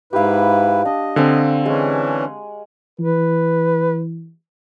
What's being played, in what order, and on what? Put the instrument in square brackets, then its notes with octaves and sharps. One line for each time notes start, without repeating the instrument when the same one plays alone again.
[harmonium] G#2 E4 B4 [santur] G4 F5
[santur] D4 [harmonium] D#5
[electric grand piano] D3 C4 [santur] F5 G#5 C#6
[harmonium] E3 C#4 D4 [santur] G#3
[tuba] E3 [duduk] B4